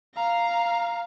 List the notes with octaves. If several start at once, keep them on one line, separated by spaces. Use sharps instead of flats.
F5 A#5